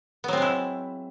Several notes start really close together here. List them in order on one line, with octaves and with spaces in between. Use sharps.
B3 F#3 C4 G#3 E4